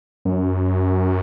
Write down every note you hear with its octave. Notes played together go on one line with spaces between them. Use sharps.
F#2